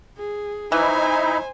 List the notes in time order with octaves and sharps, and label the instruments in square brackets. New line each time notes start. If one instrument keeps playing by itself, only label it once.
[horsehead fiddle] G#4
[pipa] E3 [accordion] D#4 E4 [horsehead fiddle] C5 G#5